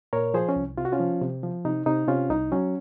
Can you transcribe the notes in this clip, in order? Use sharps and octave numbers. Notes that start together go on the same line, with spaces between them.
A#2 A#4 C#5
F3 G#4 C5
C#4
C2
C3 F4
F#4
C#4 F4
F3
C3
F3
C3 D#4
C3 D#4
C3 C#4 F4
C2 D#4
F#3 C#4